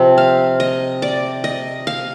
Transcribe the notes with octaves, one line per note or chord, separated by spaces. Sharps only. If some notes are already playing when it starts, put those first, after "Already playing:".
Already playing: C3 F3 C4
F5
D#5
D5
D#5
F5